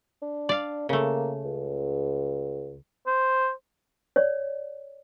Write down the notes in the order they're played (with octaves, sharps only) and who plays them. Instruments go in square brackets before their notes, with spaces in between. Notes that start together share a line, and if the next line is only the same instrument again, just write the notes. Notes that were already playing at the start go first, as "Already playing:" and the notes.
[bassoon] D4
[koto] D5 F5
[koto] C#3 A3 [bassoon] A#3
[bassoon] C#2
[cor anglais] C5
[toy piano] C#5 D5